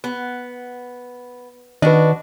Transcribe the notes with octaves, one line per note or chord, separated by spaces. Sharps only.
B3
D#3 D4 F#4 B4 D#5